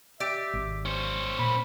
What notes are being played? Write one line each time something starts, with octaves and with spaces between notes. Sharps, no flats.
G4 D5 E5
G#1
C#4 C5 C#6
A#2 B5